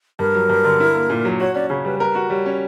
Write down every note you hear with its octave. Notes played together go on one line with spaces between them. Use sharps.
G2 A#4
F#3
G2
D3
E4
A#3
A#2
F#3
F#4 C#5
C#4 D5
C#3 C#5
G3 B4
A#4 B4
F#4
G3 C#5
C#4